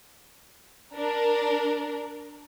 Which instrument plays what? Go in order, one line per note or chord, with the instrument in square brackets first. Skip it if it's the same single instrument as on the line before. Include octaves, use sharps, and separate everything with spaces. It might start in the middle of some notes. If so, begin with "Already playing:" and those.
[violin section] D4 A#4